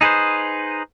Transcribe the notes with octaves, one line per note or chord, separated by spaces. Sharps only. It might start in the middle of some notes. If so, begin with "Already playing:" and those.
D#4 G#4 B4 C5